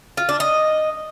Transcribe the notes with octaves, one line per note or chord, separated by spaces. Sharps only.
F4
D4
D#5